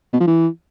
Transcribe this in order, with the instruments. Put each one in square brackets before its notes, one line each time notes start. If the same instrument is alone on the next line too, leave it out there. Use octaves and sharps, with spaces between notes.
[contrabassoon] B2
F3
E3